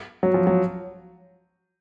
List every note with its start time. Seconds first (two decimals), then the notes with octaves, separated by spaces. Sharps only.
0.23 F#3
0.34 F3
0.47 F#3